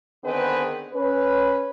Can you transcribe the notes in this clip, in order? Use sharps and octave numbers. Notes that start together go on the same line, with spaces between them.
D3 D#3 B3 C4 G#4 B4
C#4 B4